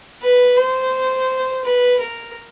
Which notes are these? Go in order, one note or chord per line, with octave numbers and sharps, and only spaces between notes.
B4
C5
B4
A#4